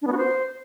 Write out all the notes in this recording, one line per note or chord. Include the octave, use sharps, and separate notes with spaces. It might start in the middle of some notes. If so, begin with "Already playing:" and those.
D4
B3
F#4
C5